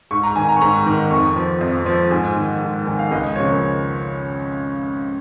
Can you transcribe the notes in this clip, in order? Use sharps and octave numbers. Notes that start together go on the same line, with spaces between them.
G#2 C#6
A#5
D#3 G#5
A#5
C#6
G#2 A#5
D#3
F2 C#6
F3
F2
F3
G#2 G#5
D#3
G#2
D#3 G#5
F5
C#2 D#5
C#3 F3 C#5
A#4